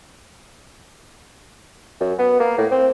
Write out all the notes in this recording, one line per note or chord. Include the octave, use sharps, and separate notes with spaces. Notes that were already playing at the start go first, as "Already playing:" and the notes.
F#2
B3
A#3
A2
C4